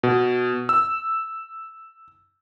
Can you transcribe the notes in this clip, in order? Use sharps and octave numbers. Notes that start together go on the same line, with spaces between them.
B2
E6